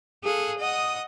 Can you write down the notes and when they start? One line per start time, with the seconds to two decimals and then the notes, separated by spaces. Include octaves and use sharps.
0.22 G#4 A4 F5 F#6
0.59 D#5 F#5 D#6